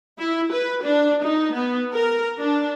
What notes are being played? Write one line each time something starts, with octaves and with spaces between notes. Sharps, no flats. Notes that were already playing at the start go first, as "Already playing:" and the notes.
E4
B4
D4
D#4
B3
A#4
D4